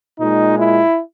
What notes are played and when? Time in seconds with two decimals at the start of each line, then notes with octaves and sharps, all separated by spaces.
0.18 A#2 G#3 D#4
0.58 E4